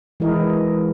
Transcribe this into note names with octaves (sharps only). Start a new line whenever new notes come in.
E3 G#3 E4 A#4 D#5